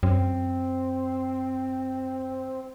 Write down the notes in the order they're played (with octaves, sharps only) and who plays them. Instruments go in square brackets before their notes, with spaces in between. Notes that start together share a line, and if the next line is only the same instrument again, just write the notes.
[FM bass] F#2 [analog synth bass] C4